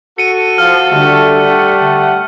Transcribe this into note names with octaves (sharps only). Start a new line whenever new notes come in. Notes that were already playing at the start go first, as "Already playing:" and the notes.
F#4 A4 C#7 D#7
F3 F6
D3 G3 A3
F#5